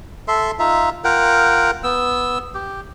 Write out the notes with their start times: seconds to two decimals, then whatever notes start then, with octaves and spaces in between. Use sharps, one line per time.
0.28 A4 E5 C6
0.59 D#4 F4 E5
1.04 F4 A#4 F#5 G5
1.84 B3 E6
2.55 G4